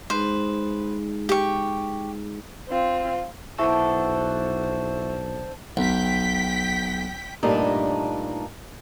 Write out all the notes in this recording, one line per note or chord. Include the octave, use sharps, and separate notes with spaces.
G#3 D#4 G#4 B4 C5
G4 C#6
C4 F4
B1 B3 D4 E4 A4 C5 E5 C#6
B1 G5 B6
G2 A#2 A3 D4 D#4